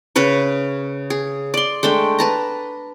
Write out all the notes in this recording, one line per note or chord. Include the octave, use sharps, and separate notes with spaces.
C#3 C#4 B4 C#5
G#4
D5 C6
G#3 A3 D4 G5
B4 A5 A#5